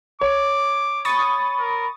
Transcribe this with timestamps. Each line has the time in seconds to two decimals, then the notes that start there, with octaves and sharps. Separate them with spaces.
0.21 C#5 D6
1.05 B5 C#6 D#6 A6
1.59 A#4